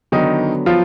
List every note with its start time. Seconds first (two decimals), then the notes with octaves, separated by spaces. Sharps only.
0.12 D3 D#3 F#3 B3 D#4
0.66 F3 F#3 B3 F4